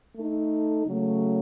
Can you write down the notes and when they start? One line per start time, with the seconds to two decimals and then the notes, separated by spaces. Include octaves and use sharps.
0.16 A3 D#4 A4
0.85 C#3 F#3 A3